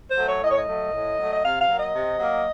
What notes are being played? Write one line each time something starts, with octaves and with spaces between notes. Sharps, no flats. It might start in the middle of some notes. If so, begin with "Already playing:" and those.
C5
F#3 A3
C#5
A2 D#5
C#5
D#5
F#3 A3
A2
F#3 A3
D#5
C3 F5
F5
F#3 A#3
D#5
C3
F#3 A#3